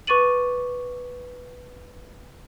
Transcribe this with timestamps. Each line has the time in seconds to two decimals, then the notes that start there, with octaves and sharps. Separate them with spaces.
0.07 B4 C#6 D6 A6 D#7 F#7